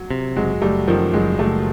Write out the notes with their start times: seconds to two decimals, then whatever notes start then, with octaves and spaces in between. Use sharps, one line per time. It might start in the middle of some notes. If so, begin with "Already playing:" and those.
Already playing: F#3
0.10 C3
0.36 F#1 F#3 G#3
0.61 F#1 G3 A3
0.87 F#2 D#3 F3
1.13 F#1 F#3 G#3
1.39 F#1 G3 A3